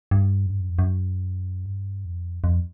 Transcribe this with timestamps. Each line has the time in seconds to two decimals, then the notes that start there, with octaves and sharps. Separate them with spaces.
0.11 G2
0.46 F#2
0.51 G2
0.60 F#2
0.70 F2
0.79 F#2
1.66 G2
2.05 F2
2.44 F2